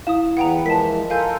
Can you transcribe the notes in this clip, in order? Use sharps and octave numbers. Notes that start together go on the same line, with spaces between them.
E4 F5 D#6 E7
E2 B4 F#5 G5 A#5
E3 F3 G#3 A#4 A5 B6
F4 A4 A#4 F5 G#5 G6